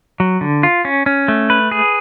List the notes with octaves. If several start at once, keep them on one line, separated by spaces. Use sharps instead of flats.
F#3
D3
F4
C#4
C#4
A3
B4
G#4